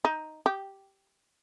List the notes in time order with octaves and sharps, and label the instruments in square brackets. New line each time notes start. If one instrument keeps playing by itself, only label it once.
[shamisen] D#4
G4